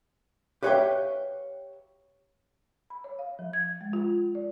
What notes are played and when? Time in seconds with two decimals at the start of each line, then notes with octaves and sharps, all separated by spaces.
0.63 G4 B4 C#5 E5 F5 G5
2.90 B5
3.04 C#5
3.19 F5
3.39 F3
3.53 G#6
3.81 G#3
3.93 F4
4.35 D5